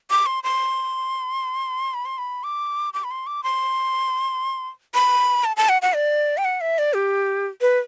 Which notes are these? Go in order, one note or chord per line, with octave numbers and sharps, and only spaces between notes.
D6
C6
C6
B5
C6
B5
D6
D6
B5
C6
D6
C6
B5
A5
A5
F#5
F#5
D5
G5
F#5
E5
D5
G4
B4